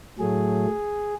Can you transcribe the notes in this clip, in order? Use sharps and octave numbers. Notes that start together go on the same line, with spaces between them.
A2 F#3 A3 G#4